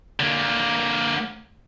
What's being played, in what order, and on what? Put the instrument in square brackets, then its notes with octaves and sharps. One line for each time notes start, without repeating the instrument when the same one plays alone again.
[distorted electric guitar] D3 A#3